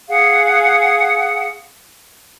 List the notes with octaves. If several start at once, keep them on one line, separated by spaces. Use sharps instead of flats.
G#4 F5 F#5